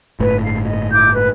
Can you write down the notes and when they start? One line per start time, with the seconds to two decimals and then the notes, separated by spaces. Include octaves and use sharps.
0.19 G1 A2 B4
0.43 F5
0.66 D#5
0.91 E4 D6 G6
1.13 B4